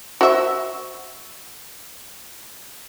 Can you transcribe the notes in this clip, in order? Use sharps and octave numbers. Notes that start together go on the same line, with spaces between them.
F#4 C5 E5